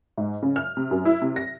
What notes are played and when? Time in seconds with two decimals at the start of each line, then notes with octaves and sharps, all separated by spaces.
0.18 G#2
0.42 C#3
0.56 F6
0.77 C3
0.91 F#2
1.05 E4
1.22 C3
1.36 A#6